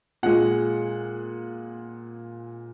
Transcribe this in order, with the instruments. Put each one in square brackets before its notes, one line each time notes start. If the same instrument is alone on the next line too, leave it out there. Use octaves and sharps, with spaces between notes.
[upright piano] A#2 G#3 F#5